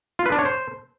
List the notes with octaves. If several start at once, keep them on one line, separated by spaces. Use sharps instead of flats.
F4
B4
D4
C#5
C5